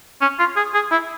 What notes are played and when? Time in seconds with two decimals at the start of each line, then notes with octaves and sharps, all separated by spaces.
0.21 C#4
0.39 F4
0.57 G#4
0.74 G#4
0.91 E4